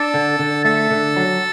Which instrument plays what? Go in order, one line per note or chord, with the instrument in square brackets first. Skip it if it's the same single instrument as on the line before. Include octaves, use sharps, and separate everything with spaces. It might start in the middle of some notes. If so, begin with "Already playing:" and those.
Already playing: [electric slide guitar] D4 [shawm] A4
[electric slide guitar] D3
D3
[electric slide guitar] A3 [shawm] A4
[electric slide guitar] D3
F#3